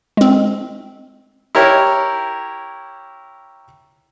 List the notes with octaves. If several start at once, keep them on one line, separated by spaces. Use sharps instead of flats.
G#3 C4
E4 G4 A#4 C#5